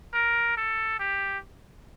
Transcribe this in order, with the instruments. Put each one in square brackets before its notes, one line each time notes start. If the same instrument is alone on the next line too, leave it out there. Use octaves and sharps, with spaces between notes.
[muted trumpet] A#4
A4
G4